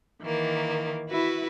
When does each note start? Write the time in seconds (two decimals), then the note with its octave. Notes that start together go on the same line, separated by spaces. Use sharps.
0.23 D#3 E3 A#3
1.09 E4 F#4 B4 E5